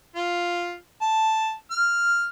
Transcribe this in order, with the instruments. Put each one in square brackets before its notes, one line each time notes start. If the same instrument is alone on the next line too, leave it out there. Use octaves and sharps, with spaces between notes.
[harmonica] F4
A5
F6